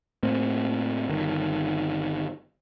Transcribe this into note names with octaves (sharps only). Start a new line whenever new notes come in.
A2 A#3 C4
G1 D#3